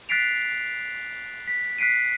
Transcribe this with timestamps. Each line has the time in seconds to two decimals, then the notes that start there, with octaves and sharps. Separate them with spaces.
0.09 F#6 A6 B6 C7 D7 F7
1.48 B6
1.78 F#6 B6 C7 D7 D#7